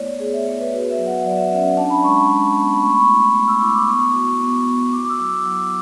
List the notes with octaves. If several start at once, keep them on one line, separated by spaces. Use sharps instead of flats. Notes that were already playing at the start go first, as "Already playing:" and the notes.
Already playing: A3 B3 E4 C#5 D5
B3 G#4
E5
E4 C#5
B4
F#4 B4
E5
F#3
F#5
F#3 D5
E5
C#4 E5
F#5
D4 A5
B5
G#3 C#6
G#3
B3
B5
A3 C#6
B5
C#6
E4
C#6
A3 C#6
E6
E4 D6
D6
B3 C#6
F#4
B3
F#4
E4 D6
D6
E6
F#3
D6
F#3 E6